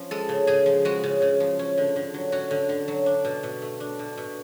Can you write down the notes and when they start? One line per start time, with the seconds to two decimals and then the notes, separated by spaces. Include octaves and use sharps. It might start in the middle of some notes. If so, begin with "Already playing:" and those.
Already playing: F3 C#4
0.11 G#3 A4
0.29 C#3
0.47 C#3 G#4
0.66 F3
0.85 G#3 F#4
1.03 C#3
1.22 C#3
1.40 F3
1.59 C#4
1.77 D3
1.96 D3
2.14 F#3
2.32 C#4 F#4
2.51 D3
2.69 D3
2.88 F#3
3.06 D4
3.25 B2
3.43 B2
3.62 A3
3.80 D4
3.99 B2
4.17 B2